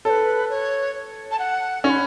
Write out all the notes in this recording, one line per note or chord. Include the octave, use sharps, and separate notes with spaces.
A4 B4 C#5
C#5
A5
F#5
C#4 C#6
B5